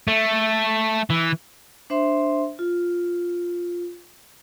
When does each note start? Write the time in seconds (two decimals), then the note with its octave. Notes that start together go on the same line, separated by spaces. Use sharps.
0.08 A3
1.10 E3
1.90 D4 C5 E5 C6
2.59 F4